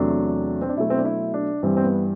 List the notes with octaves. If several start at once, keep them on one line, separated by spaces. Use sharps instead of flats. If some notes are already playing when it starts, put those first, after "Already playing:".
Already playing: E2 C3 F#3 A3 D4
C4
D4
B2 F#3 A3 E4
C4
D4
E4
D4
G2 E3 G3 C4
C4
B3